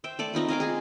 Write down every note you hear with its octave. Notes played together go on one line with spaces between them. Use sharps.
C5 E5 G5
A3 A4 D5
C4 D#4 F4 B4
D#5 F5 G#5 D6
G#4 D#5 G#5